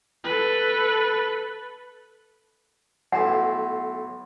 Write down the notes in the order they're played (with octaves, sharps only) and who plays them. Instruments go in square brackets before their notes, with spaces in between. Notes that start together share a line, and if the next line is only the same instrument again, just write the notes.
[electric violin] A4 B4
[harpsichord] B1 A2 A5 [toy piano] F#5